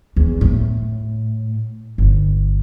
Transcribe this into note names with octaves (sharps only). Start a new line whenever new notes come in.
E2
A2
G1